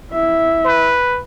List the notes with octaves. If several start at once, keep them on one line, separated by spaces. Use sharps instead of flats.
E4 E5
B4